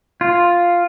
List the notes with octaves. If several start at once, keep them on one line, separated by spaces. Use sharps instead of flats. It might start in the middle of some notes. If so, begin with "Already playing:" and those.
F4